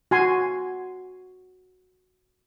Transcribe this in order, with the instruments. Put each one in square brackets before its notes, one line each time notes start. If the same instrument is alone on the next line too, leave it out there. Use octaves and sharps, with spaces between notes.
[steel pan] F#4 G#5 C6